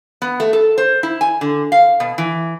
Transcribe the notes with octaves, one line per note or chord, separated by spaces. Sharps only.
B3
A3
A4
C5
E4
G#5
D3
F5
B2
E3